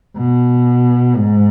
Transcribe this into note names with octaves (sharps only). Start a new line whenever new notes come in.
B2
G#2